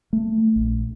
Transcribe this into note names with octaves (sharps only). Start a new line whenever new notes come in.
A3
A#1